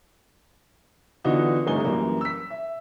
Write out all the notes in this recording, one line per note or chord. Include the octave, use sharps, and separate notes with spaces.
D3 E3 B3 D#4 F4 F#4
G1 C3 A3 D#4 G#5 G7
F#2 E3 G3 A#3
E6 B6
E5